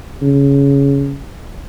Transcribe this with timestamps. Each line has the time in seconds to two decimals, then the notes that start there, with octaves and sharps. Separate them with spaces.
0.22 C#3